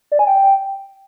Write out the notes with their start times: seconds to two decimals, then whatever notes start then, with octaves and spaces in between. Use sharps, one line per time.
0.12 D5
0.19 G#5
0.27 G5